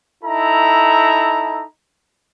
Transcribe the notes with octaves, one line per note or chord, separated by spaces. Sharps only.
D#4 E4 A4 A#5